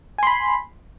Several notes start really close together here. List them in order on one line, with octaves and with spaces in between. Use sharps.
G#5 C6 B5